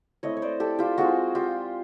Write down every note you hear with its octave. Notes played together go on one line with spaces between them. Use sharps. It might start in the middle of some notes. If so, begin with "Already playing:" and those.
A3 C4 E4 C#5 D#5
C#5
C5 D5
G4 A4
F4 G4
G#3 C4 F4 F#4 G#4
F4 G4